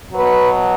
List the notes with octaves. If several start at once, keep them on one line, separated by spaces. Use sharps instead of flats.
B2 F#3 B4